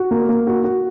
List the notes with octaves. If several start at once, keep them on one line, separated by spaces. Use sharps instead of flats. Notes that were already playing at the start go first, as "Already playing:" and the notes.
Already playing: F#4
A#3
A#3
F#4
F#4